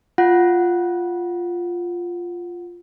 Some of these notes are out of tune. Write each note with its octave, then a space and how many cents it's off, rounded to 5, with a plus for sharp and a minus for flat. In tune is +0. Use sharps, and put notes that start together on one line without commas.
F4 +0 F#5 +0